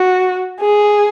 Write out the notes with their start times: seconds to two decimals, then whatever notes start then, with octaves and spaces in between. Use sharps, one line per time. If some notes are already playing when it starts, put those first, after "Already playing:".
Already playing: F#4
0.60 G#4